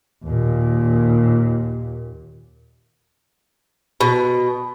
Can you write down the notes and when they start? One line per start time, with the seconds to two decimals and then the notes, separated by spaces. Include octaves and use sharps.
0.25 D#2 A#2
4.01 B2